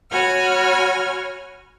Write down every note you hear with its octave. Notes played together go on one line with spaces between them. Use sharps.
F#4 C#5 F#5 G#5 B5 F6